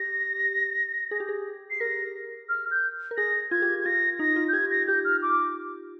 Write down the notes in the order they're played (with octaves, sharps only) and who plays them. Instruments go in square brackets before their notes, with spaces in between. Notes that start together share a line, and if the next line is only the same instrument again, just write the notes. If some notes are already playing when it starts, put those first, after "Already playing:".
Already playing: [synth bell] G4 [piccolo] A#6
[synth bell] G#4
G4
G#4
[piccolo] C7
[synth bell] A#4 [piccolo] A#6
[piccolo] F6
G6
[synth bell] A#4
[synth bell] G#4 [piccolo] A#6
[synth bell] F4 [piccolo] G#6
[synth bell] G4
[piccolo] G#6
[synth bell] F4 [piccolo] A#6
[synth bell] D#4 [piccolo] A#6
[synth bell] F4
[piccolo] G6
[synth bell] G4 [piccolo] G#6
[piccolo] A#6
[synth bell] G4 [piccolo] G6
[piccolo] F6
D6